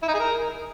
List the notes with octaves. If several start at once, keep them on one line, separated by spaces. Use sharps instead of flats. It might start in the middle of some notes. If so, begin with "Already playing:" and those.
E4
D#4
G#4
A#4